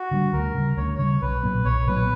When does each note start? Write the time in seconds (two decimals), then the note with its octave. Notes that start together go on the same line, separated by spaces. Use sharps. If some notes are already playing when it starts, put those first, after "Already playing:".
Already playing: F#4
0.11 D3 G3
0.33 D2 A#4
0.55 C#3 G3
0.77 D2 C#5
0.98 C#3 G3 C#5
1.21 B1 B4
1.43 A#2 F#3 B3
1.65 B1 C#5
1.87 A#2 F#3 B3 B4